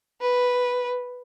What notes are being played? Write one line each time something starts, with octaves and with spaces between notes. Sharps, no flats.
B4